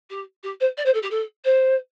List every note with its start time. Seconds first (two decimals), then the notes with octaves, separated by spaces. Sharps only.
0.10 G4
0.43 G4
0.60 C5
0.77 D5
0.85 C5
0.94 A4
1.02 G4
1.11 A4
1.44 C5